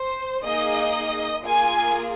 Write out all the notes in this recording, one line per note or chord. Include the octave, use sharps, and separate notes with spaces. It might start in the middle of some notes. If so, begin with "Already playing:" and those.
Already playing: C5
A#3 D#4 G#4 D#5
A#3 F4 G#4 G#5